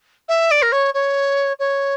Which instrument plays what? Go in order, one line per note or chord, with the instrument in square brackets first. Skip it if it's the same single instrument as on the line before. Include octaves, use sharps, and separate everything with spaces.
[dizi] E5
D5
A#4
C#5
C#5
C#5